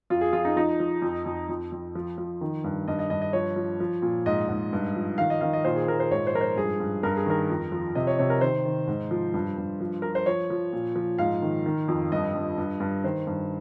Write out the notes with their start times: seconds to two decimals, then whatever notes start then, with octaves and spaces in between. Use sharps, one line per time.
0.10 F2 F4
0.21 G#4
0.33 F2 F4
0.45 D#4
0.56 F3 D#4
0.80 F3
1.02 F2
1.26 F2
1.49 F2
1.72 F2
1.95 F3
2.18 F3
2.41 D#3
2.64 G2
2.88 G2 D#5
2.99 D#5
3.10 G2 D#5
3.22 D#5
3.33 F3 C#5
3.56 F3
3.80 F3
4.02 A#2
4.26 G#2 D#5
4.49 G#2
4.73 G2
4.95 F3
5.18 D#3 F5
5.30 D#5
5.41 D#3 F5
5.53 D#5
5.65 A#2 C5
5.76 G#4
5.87 A#2 A#4
6.00 C5
6.11 G#2 C#5
6.27 C5
6.34 F3 A#4
6.41 C5
6.56 G2 G#4
6.80 G2
7.03 G2 A#4
7.17 G#4
7.26 D#3 A#4
7.50 F2
7.72 F3
7.95 C3 D#5
8.07 C#5
8.18 C3 C#5
8.30 A#4
8.41 D#3 C5
8.65 D#3
8.88 G#2
9.11 F3
9.34 G2
9.58 G2
9.80 F3
10.02 F3 A#4
10.15 C5
10.26 F3 C#5
10.50 F3
10.73 A#2
10.96 F3
11.18 G#2 F5
11.42 D#3
11.66 D#3
11.88 F2
12.12 G2 D#5
12.35 G2
12.58 G2
12.80 G2
13.04 D#3 C5
13.27 G2